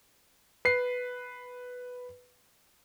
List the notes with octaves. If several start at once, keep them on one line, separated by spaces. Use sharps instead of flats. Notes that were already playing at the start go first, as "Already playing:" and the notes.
B4 C7